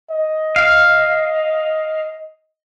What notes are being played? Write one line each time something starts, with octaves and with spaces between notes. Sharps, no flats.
D#5
F5